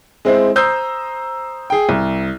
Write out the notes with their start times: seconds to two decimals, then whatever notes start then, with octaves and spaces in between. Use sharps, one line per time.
0.25 G#3 C4 E4 C5
0.56 C5 A#5 D#6 E6 G6 C7
1.70 G#4 G5
1.89 C2